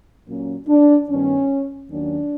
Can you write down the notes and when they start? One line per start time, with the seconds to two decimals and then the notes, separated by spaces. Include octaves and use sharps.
0.27 A#2 F#3 A#3 C#4
0.68 D4
1.09 G2 D#3 G3 B3 C#4
1.90 D#2 D#3 F#3 A#3 C#4 D4